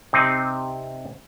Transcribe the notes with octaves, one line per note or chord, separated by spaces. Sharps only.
C3 C4 D#4